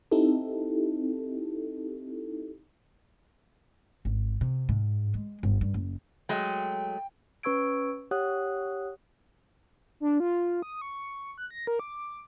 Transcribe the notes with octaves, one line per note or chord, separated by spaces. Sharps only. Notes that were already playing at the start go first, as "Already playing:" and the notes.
C4 D#4 E4 G4 A4
G#1
C3
G#2
G#3
G1
G2
F#1
F#3 G#3 A3 G5
C#4 B4 C#6 E6 G#6 D7
G4 C#5 F#5 D#6 F#6
D4
F4
D#6
C#6
F#6
A#6
A#4
D6